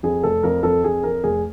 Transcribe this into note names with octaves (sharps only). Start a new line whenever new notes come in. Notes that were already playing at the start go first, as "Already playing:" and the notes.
F2 G#4
F1 A4
F2 A#4
F2 A4
F2 G#4
F2 A#4
F1 G#4